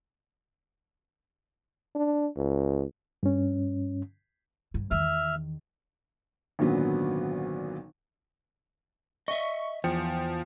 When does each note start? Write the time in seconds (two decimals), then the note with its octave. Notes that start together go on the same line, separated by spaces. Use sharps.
1.95 D4
2.36 C#2
3.23 G2 C#4
4.74 G2
4.91 E2 D#3 E5 F6
6.59 G#1 A#2 D3 F#3 B3 C#4
9.28 D#5 E5 C#6
9.84 E2 F3 G5 C#7